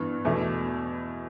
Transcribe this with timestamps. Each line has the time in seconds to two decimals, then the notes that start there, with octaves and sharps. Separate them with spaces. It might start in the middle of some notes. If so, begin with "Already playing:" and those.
Already playing: G2 E3 B3
0.25 E2 B2 A3 E4